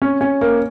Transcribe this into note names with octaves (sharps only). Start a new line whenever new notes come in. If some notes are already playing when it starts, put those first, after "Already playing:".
C#4
C#4
A#3